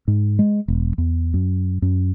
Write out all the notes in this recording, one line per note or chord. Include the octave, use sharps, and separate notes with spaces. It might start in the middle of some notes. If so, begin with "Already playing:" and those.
G#2
G#3
E1
E2
F#2
F#2